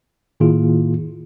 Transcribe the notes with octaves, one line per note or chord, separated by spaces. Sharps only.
A2 D#3 A#3 E4 F4 G#4